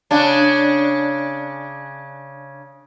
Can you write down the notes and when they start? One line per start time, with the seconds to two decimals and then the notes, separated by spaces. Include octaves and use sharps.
0.11 C#3 D4